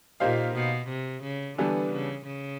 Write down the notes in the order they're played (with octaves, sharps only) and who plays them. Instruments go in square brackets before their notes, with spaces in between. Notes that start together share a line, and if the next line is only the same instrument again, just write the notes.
[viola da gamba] A#2 [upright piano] A#3 D#4 G4 C5 F5
[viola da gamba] B2
C3
C#3
[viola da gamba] D3 [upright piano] E3 G3 B3 D4
[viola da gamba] C#3
C#3